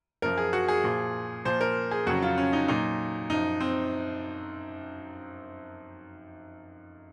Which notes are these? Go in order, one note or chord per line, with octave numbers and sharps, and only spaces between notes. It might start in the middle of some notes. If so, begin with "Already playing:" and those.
F#2 F3 A#4
G#4
F#4
G#4
A#2 F3
A#2 F3 C5
A#4
G#4
F2 C#3 F#3 F#4
F4
C#4
D#4
A#2 F#3 D#4
F#2 F3 D#4
C4